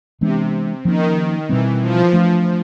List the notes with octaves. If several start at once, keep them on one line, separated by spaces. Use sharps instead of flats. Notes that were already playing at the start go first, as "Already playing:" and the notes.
C3 E3 G#3 B3 D4
D#3 F3 A#3 C#4
B2 E3 G3 C4
F3
F3 A3 D4